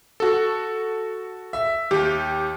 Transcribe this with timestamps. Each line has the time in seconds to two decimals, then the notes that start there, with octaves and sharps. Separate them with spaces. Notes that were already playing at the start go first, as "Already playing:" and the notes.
0.20 F#4 A4
1.53 E5
1.91 D#2 G4